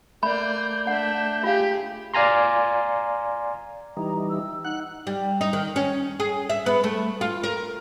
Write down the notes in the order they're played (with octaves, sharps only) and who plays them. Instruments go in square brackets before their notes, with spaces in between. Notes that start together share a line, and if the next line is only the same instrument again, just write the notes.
[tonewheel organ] A3 G6 [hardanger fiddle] A#3 D5 [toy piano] B5
[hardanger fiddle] D4 E5 [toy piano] F#5
[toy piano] F4 F5 [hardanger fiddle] G4 G#4
[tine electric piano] D5 F5 G#5 A#5 C6
[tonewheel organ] E3 G3 D#4 [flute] A#5
[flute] E6
[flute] D#4 [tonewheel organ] F#5 F#6
[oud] G3
D#4
D#3
C#4
G#4
E5
B3
A3
F4
A#4